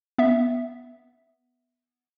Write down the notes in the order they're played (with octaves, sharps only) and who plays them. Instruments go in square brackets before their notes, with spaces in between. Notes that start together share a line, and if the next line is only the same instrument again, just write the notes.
[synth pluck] B3 E5